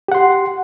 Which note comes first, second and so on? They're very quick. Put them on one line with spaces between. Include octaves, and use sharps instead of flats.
G4 F#5 C6